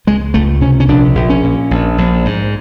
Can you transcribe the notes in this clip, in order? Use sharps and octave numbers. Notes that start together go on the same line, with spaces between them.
C#2 G#3
C#2 A3
C3 C#4
C#4
A#1 D4
A#1
C#4
A#2
A#1
A#1
G#2